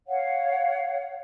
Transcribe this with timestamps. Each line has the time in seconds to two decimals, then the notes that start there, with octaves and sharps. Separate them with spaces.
0.06 C#5 F5 F#5